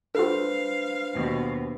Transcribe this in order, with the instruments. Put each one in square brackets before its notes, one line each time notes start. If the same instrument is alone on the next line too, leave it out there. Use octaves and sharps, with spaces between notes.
[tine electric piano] D4 B4 C5 [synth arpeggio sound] F4 A4 [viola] F5
[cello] D#2 B2